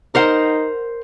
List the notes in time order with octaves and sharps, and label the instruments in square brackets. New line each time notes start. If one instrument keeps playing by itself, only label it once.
[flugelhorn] D#4 [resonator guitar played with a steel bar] A#4 C5 F#5